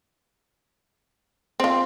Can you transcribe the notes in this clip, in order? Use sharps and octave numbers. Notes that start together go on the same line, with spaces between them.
C4 F4 C6